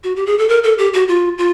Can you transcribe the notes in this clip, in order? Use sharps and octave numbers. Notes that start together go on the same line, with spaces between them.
F#4
G4
G#4
A4
A#4
A4
G4
F#4
F4
F4